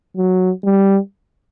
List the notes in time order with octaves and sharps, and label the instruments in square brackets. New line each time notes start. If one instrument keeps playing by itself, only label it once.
[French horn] F#3
G3